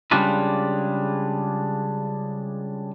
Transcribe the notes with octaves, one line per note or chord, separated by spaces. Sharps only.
C#3 G3 G#3 D4 F4 B4